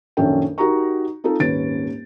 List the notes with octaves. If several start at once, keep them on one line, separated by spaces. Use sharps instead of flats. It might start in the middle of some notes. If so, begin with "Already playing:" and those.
A#1 F#2 D#3 C#4 A4 G5
D#4 F#4 G4 A#4 A#5 C#6
C4 D#4 F4 A4
D#1 G#1 C#4 B4 A6 D7